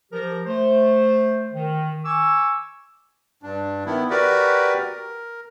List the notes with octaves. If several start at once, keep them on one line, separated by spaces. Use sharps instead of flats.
F3 G4 A#4
A3 C5
D#3
G#5 C#6 D6 E6
G2 D4
D#3 B3 E4
F#4 G4 A#4 B4 D5
A#4